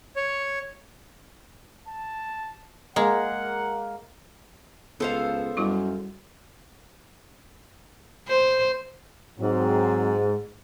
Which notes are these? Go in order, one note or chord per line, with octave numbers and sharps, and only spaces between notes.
C#5
A5
G#3 A#3 F#5
C#2 B3 A4 C5 F5
F#2 G3 E4 F#4
C5
G#2 F#3 C4